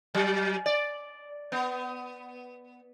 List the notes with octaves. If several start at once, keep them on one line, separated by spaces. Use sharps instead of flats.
F#3
D5
B3